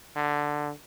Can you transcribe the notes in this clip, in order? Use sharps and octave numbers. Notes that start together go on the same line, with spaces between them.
D3